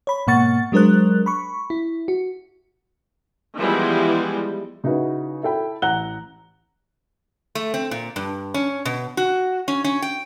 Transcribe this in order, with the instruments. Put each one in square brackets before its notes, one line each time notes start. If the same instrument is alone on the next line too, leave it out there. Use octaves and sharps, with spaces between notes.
[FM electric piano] C#5 B5
G#2 B2 A#3 F#5 C#6 A6
F#3 G#3 D4 A#4 C5 F#6
B5 C#6
E4
F#4
[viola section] E3 F3 G3 G#3 B3 E4
[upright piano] C#3 D#4 E4 F#4 B4
E4 A4 G5 B5
A1 F#5 A#5 F#6 G7
[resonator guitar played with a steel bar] A3
C4
A#2
G2
C#4
B2
F#4
C#4
C#4
G5